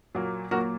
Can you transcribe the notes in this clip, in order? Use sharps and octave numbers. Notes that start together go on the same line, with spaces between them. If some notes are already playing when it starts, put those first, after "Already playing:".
A#2 F#3 A#3
A#2 F#3 A#3 F#4 A#4